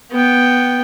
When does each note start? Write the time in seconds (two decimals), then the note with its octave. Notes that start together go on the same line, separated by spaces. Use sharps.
0.11 B3 G5